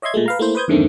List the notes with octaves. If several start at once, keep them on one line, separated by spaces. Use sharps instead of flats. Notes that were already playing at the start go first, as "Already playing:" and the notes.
C#5 D#5 E5 C6 G#6
A#2 G#3 A3
B4 F5 A#5
A3 A#3 E4 C5
B4 C5 D#6 G6 G#6
E2 G2 D3 D#3 A3 C4